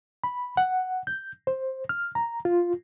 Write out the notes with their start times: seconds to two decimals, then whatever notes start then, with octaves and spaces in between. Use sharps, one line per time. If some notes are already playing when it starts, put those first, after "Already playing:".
0.24 B5
0.57 F#5
1.07 G6
1.47 C5
1.89 F6
2.15 A#5
2.45 F4